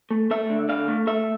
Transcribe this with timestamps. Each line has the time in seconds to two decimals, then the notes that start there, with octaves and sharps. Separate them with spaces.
0.11 A3
0.31 A3 E5
0.49 D3
0.69 D3 F5
0.88 A3
1.07 A3 E5